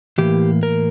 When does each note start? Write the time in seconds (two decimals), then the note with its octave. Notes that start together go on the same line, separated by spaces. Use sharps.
0.18 A2 E3 A#3 G4
0.63 A#4